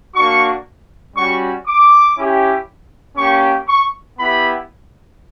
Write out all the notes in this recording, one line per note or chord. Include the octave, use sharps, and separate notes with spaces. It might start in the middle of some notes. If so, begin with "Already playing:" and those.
A#3 D4 F#4 C#6
G3 C#4 F#4 C#6
D6
C#4 E4 G4
A#3 C#4 G4 C#6
C#6
B3 E4 G4 B5